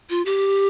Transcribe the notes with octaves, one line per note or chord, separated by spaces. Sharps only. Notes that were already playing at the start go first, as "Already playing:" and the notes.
F4
G4